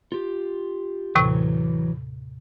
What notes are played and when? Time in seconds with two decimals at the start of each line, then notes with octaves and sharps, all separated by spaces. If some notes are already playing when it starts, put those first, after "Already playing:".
0.12 F4 G4
1.15 D#2 A2 C3 E3 F#3